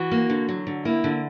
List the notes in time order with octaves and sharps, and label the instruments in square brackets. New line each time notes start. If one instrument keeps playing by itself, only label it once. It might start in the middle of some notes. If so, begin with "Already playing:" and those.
Already playing: [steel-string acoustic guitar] E3 [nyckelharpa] F#4
[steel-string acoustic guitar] A#3
D3
F#3
D3
[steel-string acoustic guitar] A#3 [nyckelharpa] E4
[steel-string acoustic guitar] D3